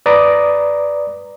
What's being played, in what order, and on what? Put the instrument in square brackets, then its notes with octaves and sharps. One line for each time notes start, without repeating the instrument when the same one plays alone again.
[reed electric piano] B4 D5 A#5 D#6